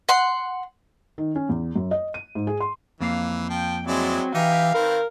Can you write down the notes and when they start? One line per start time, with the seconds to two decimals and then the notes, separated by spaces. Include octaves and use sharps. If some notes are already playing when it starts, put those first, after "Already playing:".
0.09 F#5 C6
1.18 D#3
1.35 C#4
1.49 E2
1.76 F#2
1.91 D#5
2.14 D#7
2.35 G#2
2.47 G#4
2.60 C6
3.01 F2 E3 A#3 F5
3.50 F3 G5
3.87 F#3 G#3 C4 E4 D5
4.35 E3 D#4 G4 E5 F5
4.74 D#3 C4 A#4 B4